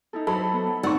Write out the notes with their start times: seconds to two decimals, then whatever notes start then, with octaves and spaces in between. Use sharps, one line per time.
0.13 D#4 E4 A4
0.27 F#3 A4 C5 B5
0.53 B3
0.83 F#1 C4 D#4 D5 F#5 C#6 E6